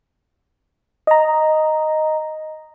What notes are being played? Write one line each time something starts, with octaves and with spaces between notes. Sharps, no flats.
D#5 A#5